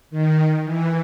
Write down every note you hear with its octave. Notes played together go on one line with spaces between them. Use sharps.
D#3
E3